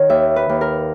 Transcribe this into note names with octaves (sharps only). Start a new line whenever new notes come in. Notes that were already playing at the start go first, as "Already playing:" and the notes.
Already playing: D#3 C#5
D#2 E5
B4
D#2
A#4